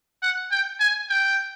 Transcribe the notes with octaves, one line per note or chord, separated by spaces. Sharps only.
F#5
G5
G#5
G5